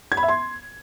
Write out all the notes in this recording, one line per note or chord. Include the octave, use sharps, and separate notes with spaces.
G#6
B5
E5
C6